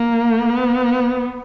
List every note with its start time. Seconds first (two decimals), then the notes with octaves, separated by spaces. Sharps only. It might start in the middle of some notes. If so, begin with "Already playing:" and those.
Already playing: A#3
0.50 B3